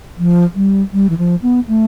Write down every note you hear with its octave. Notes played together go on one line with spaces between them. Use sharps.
F3
G3
G3
E3
F3
B3
A3